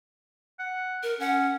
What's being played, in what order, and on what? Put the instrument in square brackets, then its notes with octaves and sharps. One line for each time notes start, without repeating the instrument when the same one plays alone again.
[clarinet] F#5
[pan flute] A#4
[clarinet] C#4 [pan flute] F#5